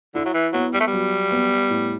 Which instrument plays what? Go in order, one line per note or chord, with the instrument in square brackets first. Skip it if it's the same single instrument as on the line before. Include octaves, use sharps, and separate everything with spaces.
[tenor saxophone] D3 [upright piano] E4
[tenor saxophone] F#3
E3
[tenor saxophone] F#3 [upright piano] B3
[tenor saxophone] G3
A3
G3
[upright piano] F#3
B3
A2